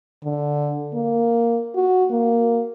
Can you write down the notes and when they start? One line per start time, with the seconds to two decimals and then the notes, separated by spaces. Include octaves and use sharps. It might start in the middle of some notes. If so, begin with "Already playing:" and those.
0.24 D3
0.94 A#3
1.75 F#4
2.11 A#3